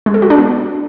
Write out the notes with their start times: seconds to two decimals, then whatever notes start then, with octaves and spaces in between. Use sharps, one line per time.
0.06 G#3
0.14 A4
0.22 F#4
0.30 D4
0.38 B3